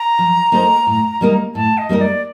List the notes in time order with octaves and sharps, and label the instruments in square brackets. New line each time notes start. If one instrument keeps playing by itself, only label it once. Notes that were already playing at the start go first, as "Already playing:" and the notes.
Already playing: [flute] A#5
[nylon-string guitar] F3
A#3 D#4 A4 C5
A2
G3 A#3 D#4 A#4
[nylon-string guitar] A2 [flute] A5
[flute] D#5
[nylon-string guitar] G3 A#3 D#4 A#4
[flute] D5